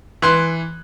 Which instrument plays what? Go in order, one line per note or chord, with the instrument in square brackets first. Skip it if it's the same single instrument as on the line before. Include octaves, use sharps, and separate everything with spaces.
[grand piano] E3 C6 F#6